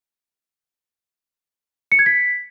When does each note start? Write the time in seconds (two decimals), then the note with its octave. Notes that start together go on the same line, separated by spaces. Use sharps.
1.92 C#7
1.99 G#6
2.06 B6